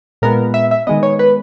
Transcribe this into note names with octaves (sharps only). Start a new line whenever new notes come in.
A#2 G#3 B3 A#4
E5
E5
D#3 G#3 B3 D#5
C#5
B4